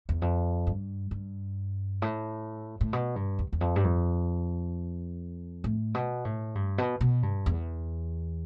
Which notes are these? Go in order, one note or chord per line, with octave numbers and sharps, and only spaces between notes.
E2
F2
G2
G2
A2
A2
B2
G2
E2
E2
F2
G2
F2
A2
B2
A2
G2
B2
B2
G2
E2